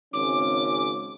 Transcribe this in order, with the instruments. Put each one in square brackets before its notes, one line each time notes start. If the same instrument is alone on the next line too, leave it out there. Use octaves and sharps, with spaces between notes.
[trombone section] G#1 C#3 C#4 [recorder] D6